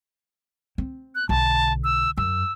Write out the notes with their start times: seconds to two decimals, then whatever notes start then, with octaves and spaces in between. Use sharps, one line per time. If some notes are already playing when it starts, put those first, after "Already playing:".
0.78 C4
1.15 F#6
1.29 B1 D3 A5
1.84 E6
2.17 F#2 E6